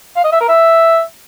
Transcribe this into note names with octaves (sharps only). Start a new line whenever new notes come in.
F5
D#5
E5
A#4
E5